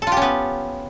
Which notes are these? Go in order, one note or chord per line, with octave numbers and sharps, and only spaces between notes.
B3 C#4 F4 G4 A4